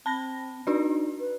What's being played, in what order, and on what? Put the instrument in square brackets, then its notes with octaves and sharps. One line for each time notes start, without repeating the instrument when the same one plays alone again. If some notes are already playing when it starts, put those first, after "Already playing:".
[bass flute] C4 [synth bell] A5 B5 A#6
[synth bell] D4 F#4 D5 [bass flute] D#4
[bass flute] B4